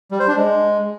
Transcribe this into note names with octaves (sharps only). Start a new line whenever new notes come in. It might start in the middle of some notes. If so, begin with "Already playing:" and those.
G3
C5
D4
G#3